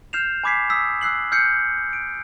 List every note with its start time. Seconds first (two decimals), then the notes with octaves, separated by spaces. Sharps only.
0.13 F6 G6 C7 E7 F7
0.44 G#5 B5 D6 G#6 B6 C7
0.70 D#6 E6 B6
1.01 E6 F#6 C7 F#7
1.32 E6 F6 G6 C7 C#7
1.93 D7